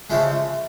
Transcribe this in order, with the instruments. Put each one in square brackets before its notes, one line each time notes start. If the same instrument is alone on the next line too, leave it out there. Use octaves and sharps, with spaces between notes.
[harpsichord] C#3 F3 G#3 E5